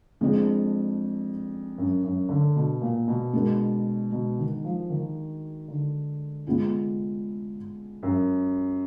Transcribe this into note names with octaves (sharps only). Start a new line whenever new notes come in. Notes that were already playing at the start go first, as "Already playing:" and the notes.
F2 G#3 D4 G#4
F#2
F#2
D3
B2
A#2
B2
G#3 D4 F#4 A#4
B2
D#3
F3
D#3
D3
G#3 B3 F4 G#4
F#2